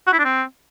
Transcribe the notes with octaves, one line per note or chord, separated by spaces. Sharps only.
F#4
E4
D4
C4